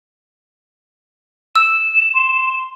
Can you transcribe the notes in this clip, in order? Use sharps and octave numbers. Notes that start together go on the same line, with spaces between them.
E6 E7
C6